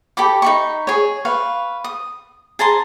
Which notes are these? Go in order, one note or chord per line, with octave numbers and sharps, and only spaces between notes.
G4 A4 B5 D6
D#4 B5 C#6
G#4 C#5
B4 F5 C#6
D#6
G#4 A5 A#5 C6